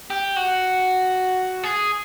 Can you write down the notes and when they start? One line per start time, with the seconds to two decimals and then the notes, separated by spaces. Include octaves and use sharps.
0.10 G4
0.36 F#4
1.63 G#4